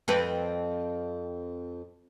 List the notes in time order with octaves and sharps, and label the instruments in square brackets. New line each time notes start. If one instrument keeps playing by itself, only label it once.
[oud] F2 C4 B4